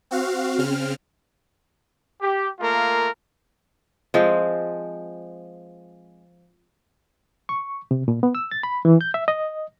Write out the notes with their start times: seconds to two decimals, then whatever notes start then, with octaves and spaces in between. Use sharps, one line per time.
0.11 C4 F#4 F5
0.58 C#3 C4 F6
2.22 G4
2.60 A3 A#3 F4 A#4
4.14 F3 G#3 C4
7.49 C#6
7.91 C3
8.08 A#2
8.23 B3
8.35 E6
8.51 A6
8.63 B5
8.85 E3
9.01 G6
9.14 E5
9.28 D#5